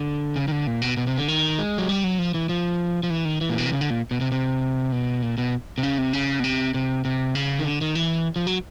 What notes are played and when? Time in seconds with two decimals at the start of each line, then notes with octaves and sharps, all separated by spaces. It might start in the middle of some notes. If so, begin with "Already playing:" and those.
Already playing: D3
0.36 C#3
0.48 D#3
0.52 D3
0.67 A#2
0.82 B2
0.97 B2
1.07 C3
1.18 D3
1.28 D#3
1.59 G#3
1.78 F#3
1.89 G3
2.04 F#3
2.19 F3
2.34 E3
2.49 F3
3.03 F3
3.10 E3
3.25 D#3
3.41 E3
3.50 A#2
3.58 B2
3.66 C3
3.72 C#3
3.81 D3
3.90 A#2
4.11 B2
4.21 C3
4.32 C3
4.92 B2
5.22 A#2
5.38 B2
5.78 C3
5.83 C#3
5.98 C3
6.13 C#3
6.40 B2
6.44 C3
6.74 C3
7.05 C3
7.35 C#3
7.59 D#3
7.65 D3
7.81 D#3
7.95 E3
8.36 F3
8.47 F#3